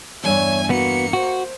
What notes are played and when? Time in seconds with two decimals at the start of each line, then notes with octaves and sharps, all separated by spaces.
0.24 E2 G2 C#5 E5 G#5
0.70 A#3 B3 F#4 C#7
1.13 F#4 C5